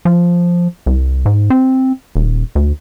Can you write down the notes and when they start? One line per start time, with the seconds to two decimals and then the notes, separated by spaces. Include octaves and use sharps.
0.05 F3
0.86 C2
1.26 G#2
1.50 C4
2.16 D#1
2.55 D2